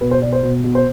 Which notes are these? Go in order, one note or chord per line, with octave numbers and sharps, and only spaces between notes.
B2 B4
C5
B2 D5
C5
B2
B2
C5